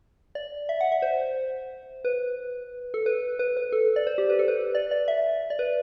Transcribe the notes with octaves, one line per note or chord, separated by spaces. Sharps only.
D5
E5
F#5
E5
C5
B4
A4
B4
B4
B4
A4
D5
C5
G4
B4
A4
B4
D5
D5
E5
D5
B4